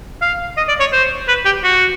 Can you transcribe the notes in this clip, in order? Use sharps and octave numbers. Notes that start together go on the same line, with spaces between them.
F5
D#5
D5
C#5
C5
B4
G4
F#4